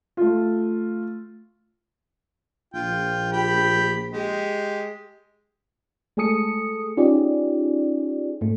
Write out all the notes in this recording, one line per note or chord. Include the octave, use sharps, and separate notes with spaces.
A3 F4
A#1 F4 G5
G4 G5 B5
G#3 G4
G#3 A3 G#4 A4 D#6 C#7
C#4 D#4 F4 G4 G#4 D5
G#2 A3